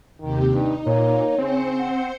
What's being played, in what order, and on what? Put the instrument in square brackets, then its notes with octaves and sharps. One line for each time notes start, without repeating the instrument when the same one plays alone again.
[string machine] D#2 C3 G4 [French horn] D#3
[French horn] G2 [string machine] D#4
[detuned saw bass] A#2 [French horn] A#3 [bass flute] C#5
[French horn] C#3 [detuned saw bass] C4 [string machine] C5 C#7
[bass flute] F#5